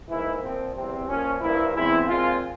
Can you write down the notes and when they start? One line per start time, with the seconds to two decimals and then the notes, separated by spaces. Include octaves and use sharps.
0.09 G#2 E3 A#3 E4
0.42 A#2 F3 A#3 C4
0.75 E2 C3 G3 C4
1.08 A#2 F3 A#3 C#4
1.41 G2 F3 A#3 E4
1.74 E2 E3 G#3 C4 E4
2.07 A#2 G#3 C4 F4